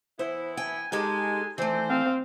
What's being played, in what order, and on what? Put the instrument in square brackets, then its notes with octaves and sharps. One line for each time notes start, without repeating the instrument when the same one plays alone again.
[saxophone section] E3 B3 E4 [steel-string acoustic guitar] C5
[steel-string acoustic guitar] G5 [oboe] G#5
[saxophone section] G#3 [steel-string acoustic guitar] D#4 G4 A4 [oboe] G#5
[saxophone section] D#3 D4 C5 [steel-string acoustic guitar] E3 A3 [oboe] C4
[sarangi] C4 [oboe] F5